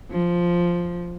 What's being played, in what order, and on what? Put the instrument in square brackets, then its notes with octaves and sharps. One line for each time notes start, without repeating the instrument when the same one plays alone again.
[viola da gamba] F3